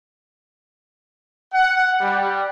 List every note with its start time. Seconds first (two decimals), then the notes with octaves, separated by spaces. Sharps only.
1.52 F#5
2.00 G3